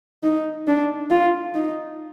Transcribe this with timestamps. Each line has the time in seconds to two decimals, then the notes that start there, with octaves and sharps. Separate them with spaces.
0.23 D#4
0.67 D4
1.10 F4
1.55 D#4